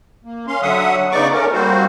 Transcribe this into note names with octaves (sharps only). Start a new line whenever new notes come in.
A#3
C#4 F5 C6
D3 F#3 E5 F#5 D#6
C#3 B3 D#4 D5 C#6 D6
A3 C#4 A#4
G3 A#3 C4 F#4 C5